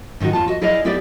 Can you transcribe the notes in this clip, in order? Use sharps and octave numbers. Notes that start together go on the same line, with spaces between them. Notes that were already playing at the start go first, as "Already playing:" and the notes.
G#2 D#3 C4 D#4 F#4
E2 F4 A5
F#4 D#5
E4 G#4 D5 D#5 F5
B3 E4 G4 G#4 D5